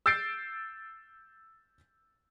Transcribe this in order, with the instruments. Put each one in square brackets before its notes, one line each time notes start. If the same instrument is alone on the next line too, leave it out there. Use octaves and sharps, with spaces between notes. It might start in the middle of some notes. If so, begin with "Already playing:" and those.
[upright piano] E6 G6 A6 C7 D7